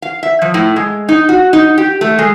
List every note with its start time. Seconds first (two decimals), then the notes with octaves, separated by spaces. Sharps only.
0.02 F5
0.23 E5
0.42 F3
0.54 A2
0.76 G#3
1.09 D#4
1.29 F#4
1.53 D#4
1.78 G4
2.01 A3
2.19 G#3